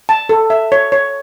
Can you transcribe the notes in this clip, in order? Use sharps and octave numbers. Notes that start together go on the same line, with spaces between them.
A5
A4
E5
C#5
C#5